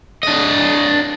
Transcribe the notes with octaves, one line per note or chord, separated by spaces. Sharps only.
D4 D#5